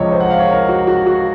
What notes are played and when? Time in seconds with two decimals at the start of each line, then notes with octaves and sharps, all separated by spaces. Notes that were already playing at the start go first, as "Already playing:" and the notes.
Already playing: C#2 C3 F3 C#5 D#5
0.12 C5
0.20 F#5
0.30 F5
0.39 C#5
0.49 A#4
0.69 F#4
0.87 F#4
1.07 F#4